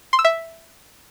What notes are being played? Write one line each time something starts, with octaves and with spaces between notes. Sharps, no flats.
C6
E6
E5